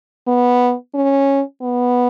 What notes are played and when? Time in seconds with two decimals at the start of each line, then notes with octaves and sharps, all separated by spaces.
0.27 B3
0.95 C#4
1.62 B3